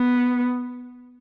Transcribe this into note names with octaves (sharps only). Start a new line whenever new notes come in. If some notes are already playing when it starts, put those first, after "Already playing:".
Already playing: B3